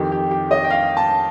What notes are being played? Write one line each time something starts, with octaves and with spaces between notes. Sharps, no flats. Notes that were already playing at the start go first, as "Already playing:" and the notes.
Already playing: F2 D#3 G4
G4
G4
D#5
G5
F5
A5